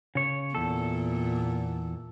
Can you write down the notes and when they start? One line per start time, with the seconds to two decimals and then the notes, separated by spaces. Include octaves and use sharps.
0.15 C#3 C#5
0.55 E2 A#2 A4